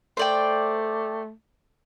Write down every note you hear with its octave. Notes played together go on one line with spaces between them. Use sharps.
A3 C5 D5 G5